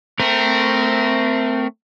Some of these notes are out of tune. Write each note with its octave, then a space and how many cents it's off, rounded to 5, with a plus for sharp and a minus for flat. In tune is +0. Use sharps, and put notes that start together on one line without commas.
A3 +15 C4 -20 A#4 +0